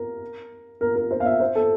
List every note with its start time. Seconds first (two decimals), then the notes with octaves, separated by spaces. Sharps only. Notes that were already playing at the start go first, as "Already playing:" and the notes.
Already playing: A#4
0.81 A#4
0.96 A#4
1.11 C5
1.20 F5
1.26 E5
1.40 C5
1.55 A4